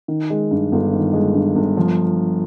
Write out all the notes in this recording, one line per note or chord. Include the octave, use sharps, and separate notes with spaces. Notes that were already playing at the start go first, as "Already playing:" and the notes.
D#3
G#3
G2
G1
D#3
G#3
G2
G1
F3